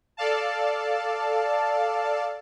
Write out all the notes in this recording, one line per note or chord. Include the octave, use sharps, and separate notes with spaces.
A4 D5 F5 A5